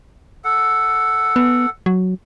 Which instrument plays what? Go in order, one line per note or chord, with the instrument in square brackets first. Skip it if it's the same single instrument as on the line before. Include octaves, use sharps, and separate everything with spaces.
[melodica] A4 F#5
[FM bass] B3
F#3